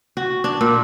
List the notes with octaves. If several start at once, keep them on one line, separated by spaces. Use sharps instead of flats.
F#4
D4
A#2